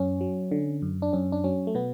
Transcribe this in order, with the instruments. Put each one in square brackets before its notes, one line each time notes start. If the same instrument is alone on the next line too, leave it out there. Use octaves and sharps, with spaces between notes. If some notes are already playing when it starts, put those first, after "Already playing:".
Already playing: [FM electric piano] F#2 C#4
F#3
D3
F#2
D4
F#2 C#4
D4
F#3 C#4
A3
B2 B3